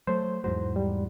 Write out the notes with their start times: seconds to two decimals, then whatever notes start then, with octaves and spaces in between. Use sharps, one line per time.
0.07 F#3 A3 C5
0.44 E2 G#2 F#3 C5
0.76 G3